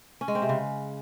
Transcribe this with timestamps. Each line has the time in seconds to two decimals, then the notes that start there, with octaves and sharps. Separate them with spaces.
0.21 C#4
0.28 G#3
0.35 C4
0.42 C3
0.49 C#3